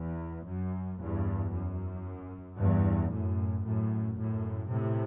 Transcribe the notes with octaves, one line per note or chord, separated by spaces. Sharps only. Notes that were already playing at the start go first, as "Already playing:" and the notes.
Already playing: E2
F#2
E2 G2
F#2
E2 G2
F#2 A2
F#2 A2
F#2 A2
A2 C3